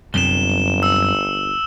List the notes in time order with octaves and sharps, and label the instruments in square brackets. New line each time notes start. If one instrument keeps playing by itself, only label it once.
[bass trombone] G1 [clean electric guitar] C2 F#2 C3 [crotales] E7 G7
[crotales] E6